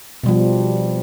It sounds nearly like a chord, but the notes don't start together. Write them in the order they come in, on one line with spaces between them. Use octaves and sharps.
B2 G3 F3